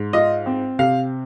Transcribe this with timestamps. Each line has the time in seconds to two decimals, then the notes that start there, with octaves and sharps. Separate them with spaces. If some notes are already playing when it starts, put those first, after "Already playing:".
Already playing: G#2
0.13 F4 D#5
0.46 C4
0.79 C3 F5